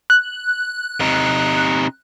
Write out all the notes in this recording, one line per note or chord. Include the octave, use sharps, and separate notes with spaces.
F#6
C3 D#4